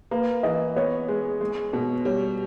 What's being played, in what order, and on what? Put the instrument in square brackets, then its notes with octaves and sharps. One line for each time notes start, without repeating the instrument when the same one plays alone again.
[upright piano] A#3 [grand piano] B4
[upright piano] E3 [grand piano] D#5
[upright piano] B3 [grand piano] C#5
[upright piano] G#3
G#3
B2
[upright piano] G3 [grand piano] C#5